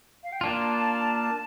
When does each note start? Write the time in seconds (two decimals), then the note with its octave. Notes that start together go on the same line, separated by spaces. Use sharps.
0.23 F5
0.32 G5
0.41 A#3 D4 F4 A5